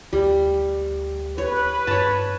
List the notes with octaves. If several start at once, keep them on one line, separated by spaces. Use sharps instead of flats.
D2 G3
B4 C#5
G2 C#5 A5